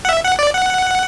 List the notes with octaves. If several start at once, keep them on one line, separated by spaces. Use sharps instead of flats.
F#5
E5
F#5
D5
F#5